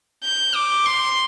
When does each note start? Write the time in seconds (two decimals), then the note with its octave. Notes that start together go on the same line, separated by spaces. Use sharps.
0.24 G6
0.55 D6
0.86 C6